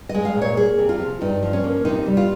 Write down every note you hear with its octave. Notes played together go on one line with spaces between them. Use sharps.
D#5
G#3
F5
A#2
C#5
A#3 G#4
C3
F4
F3
G2 D#4
F3
C#4
A#3
C3 D#4
G3
F4